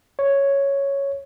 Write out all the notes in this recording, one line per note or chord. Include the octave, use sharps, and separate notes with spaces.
C#5